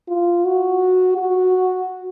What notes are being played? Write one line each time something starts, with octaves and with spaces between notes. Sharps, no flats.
F4
F#4
F#4